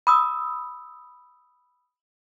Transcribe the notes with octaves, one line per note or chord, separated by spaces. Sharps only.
B5 D#6 E6